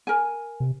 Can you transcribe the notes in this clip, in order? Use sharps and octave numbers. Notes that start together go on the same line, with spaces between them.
A#4 G#5
C3